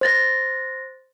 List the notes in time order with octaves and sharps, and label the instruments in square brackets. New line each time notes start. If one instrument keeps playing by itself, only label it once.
[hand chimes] C5 A6 A#6